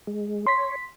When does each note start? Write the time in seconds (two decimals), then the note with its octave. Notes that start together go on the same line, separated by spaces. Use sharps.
0.07 G#3
0.47 C#5 C6 B6